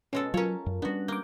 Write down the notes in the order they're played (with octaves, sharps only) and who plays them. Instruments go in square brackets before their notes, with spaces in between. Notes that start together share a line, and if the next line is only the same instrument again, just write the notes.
[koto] B2 G#3 A4 [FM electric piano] C#4
[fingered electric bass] F#3 [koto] C#4 C#5 [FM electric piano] F4 A#4
[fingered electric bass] F#2
[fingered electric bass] G3 C#4 D4 [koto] B3 F#4
[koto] A#3 [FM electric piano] D6 G6